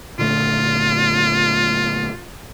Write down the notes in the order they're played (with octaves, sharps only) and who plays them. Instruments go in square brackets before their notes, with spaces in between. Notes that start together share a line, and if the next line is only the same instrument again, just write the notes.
[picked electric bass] A#2 D3 A3 [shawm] F4